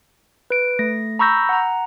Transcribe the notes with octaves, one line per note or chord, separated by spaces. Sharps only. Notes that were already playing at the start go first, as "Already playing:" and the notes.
B4 D7
A3 A#6
A#5 B5 C#6 E6 G6 A#6
F#5 A#5